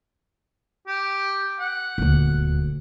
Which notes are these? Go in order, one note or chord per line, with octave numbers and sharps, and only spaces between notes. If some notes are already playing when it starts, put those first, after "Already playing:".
G4
F#5
D#1 D2